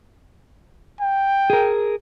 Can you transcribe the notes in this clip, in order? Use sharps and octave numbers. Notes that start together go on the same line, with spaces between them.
G5
G#4 A#4